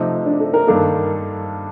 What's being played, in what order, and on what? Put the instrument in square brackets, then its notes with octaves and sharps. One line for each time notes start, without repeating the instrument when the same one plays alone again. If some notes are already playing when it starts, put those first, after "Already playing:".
Already playing: [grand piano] C3 F3 A3 D#4
[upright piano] D4
A4
A#4
[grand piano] G2 D#3 A#3 D4 [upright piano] A4